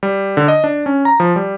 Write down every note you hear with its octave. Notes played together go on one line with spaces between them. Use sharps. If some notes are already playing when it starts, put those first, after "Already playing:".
G3
D3
D#5
D4
C#4
A#5
F3
G3